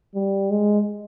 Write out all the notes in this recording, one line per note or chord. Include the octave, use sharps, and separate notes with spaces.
G3
G#3